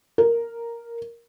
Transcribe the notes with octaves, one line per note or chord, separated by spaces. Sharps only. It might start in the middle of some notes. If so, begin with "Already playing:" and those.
A#4